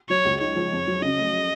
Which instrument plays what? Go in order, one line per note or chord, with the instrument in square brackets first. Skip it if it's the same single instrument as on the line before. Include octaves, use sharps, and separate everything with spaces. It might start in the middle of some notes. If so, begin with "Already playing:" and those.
[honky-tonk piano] F#3 [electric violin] C#5
[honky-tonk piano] C#2
[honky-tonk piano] D#4 [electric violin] C#5
[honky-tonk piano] F3
F2
F#3
[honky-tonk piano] C#3 [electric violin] D#5
[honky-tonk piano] A3